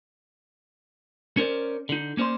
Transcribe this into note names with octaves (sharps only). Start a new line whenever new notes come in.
C#4 A#4 C5 D5
D3 D#4
A#3 C#4 C5 D5 C6